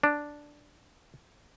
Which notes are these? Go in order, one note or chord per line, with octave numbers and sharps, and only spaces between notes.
D4